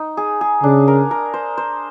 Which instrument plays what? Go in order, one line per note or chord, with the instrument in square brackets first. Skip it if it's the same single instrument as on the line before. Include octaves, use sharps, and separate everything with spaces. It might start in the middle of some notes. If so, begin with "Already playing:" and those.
Already playing: [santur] D#4
G#4
G#4
[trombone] C#3 [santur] D4
[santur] A#4
A#4
C5
C5